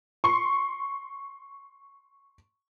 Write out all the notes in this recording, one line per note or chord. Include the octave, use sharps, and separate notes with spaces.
C6 C#6